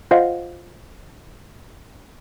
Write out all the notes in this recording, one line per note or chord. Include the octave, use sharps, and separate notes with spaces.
F4 C5 D#5 F5 F#5